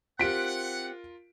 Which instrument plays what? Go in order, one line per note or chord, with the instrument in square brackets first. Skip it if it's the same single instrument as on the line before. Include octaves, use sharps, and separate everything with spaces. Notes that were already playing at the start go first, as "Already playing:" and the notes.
[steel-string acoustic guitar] C4 G4 [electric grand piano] F4 A#4 [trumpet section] F#5 [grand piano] B6 D7